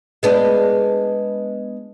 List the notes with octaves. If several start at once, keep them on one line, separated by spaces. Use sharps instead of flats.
G#3 B3 D4